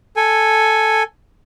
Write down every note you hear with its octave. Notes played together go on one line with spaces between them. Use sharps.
A4 G#5